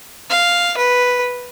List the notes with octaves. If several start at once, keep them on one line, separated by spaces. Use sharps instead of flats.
F5
B4